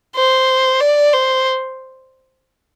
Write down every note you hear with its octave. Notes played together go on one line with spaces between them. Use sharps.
C5
D5
C5